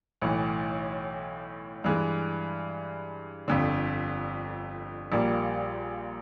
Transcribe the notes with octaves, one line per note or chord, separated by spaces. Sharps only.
B1 A2 E3
G2 E3 G#3
G1 F2 D3
A#1 A#2 G3 A#3